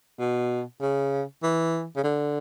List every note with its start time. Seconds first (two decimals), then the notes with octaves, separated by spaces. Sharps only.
0.19 B2
0.81 C#3
1.43 E3
1.96 C#3
2.03 D3